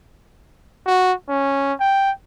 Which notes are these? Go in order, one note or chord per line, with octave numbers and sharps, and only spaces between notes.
F#4
C#4
G5